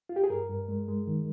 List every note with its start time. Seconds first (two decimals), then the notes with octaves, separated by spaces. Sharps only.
0.09 F4
0.16 G4
0.24 G#4
0.30 G2 A#4
0.50 G2
0.68 G#3
0.88 G#3
1.07 D#3